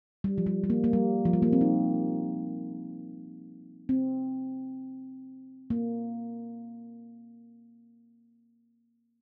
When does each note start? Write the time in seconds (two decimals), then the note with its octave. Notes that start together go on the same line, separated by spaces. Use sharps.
0.24 G3
0.38 F3
0.46 G3
0.64 G3
0.70 A#3
0.84 A#3
0.93 G3
1.25 F3
1.33 G3
1.42 A#3
1.53 C4
1.61 D#4
3.89 C4
5.70 A#3